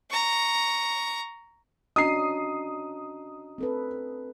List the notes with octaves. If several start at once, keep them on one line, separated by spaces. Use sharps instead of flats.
A#5 C#6
C#4 D4 F#4 D#5 A#5 D#6 C7
C4 A4 B4